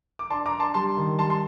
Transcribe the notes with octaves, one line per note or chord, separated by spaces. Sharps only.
D6
D4 A5 C6
A#5 D6
D4
A5 C6
G3 A5 C6
D#3
G3 A5 C6
A5 C6